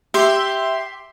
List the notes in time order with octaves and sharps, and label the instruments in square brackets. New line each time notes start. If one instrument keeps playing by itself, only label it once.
[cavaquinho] G4 [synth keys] E5 C6